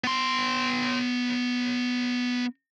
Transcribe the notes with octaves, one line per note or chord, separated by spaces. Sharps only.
B3 C6